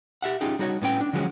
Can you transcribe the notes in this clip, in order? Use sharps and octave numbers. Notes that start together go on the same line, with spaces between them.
G4 E5 F#5
C#4 D#4 F4 G4 G#4
G3 D#4 F#4 C#5
A2 B3 C#4 G5
D4
D3 F3 F#3 G#3 C4 C#4